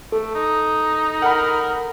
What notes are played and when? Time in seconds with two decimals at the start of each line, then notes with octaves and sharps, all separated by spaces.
0.12 A3 A4
0.34 D#4
1.22 A#4 F#5 B5